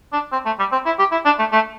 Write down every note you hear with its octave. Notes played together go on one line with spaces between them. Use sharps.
D4
C4
A3
G3
C4
E4
G4
E4
D4
A3
A3